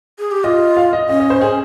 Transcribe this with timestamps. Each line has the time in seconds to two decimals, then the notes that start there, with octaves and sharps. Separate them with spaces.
0.19 G#4
0.31 G4
0.44 F4 D#5
0.77 F5
0.93 D#5
1.09 C#4 D#5
1.20 D#5
1.30 C5
1.41 G#4